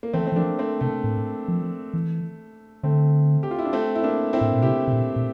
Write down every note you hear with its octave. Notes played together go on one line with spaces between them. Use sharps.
A#3
E3 A3 C4
C4
E3
F3 A#3 D4
A3 C4
C3 A3
A2
F3
E3
D3 A3 C4
G4
F4
E4
D4
A3 C4
E4
A#3 D4
C4 E4
A2
A#2
C3 E4 G4
C3
A#2
A#2